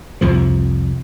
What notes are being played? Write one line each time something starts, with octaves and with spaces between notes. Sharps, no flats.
C2 F2 F3